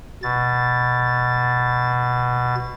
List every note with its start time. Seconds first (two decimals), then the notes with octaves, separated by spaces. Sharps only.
0.23 B2 A6